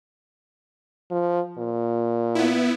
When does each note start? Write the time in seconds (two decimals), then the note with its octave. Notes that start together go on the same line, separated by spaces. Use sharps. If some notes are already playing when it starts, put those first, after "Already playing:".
1.11 F3
1.58 A#2
2.35 B3 E4